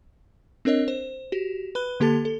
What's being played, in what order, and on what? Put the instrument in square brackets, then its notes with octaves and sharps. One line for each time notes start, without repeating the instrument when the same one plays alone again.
[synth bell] C4 D4 A#4 C#5 D#5
C5
F#4 G4
B4 B5 F#6 G7
D3 A#3 G4 A4 A5 A6
A4